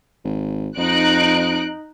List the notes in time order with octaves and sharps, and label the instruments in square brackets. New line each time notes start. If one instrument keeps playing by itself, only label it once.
[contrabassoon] G#1
[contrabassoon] F2 [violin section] D#4 F#6 D7